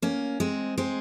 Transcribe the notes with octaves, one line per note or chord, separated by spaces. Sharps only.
A#3 C#4
G#3 C4
G#3 C4